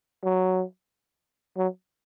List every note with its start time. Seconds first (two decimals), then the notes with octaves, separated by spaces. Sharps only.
0.24 F#3
1.57 F#3